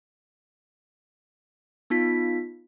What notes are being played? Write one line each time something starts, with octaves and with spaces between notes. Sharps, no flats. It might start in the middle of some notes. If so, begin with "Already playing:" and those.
B3 D#4 F4 B6